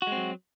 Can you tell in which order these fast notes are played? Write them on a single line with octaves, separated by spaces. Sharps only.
F#4 G#3 C4 F#3